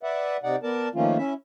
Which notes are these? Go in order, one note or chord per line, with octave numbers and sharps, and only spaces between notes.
B4 D5 E5 F#5
C3 D#4 D5 F#5
B3 A#4 D5 A5
D#3 F3 A3 A#3 C#4 F4
C#4 E4 E5